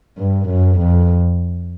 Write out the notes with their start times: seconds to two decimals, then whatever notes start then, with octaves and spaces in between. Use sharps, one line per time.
0.18 G2
0.49 F#2
0.79 F2